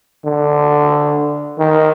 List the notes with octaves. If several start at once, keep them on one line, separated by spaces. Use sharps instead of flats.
D3
D#3